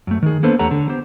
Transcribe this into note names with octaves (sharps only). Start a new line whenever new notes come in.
F#2 A3
D#3 G#4
A#3 B3 D4 A4 B4 C5
E2 A3 G4 C#5 F#5 A#5
D3
B3 G4 C5